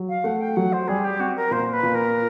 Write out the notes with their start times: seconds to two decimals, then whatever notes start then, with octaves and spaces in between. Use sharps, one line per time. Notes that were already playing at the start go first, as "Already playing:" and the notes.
Already playing: F#3
0.09 F5
0.24 A3 F#5
0.40 G5
0.56 F#3 F#5
0.73 C5
0.88 G3 G#4
1.04 G4
1.19 C4 F#4
1.36 A#4
1.51 A#2 C5
1.73 B4
1.83 A#2
1.94 A#4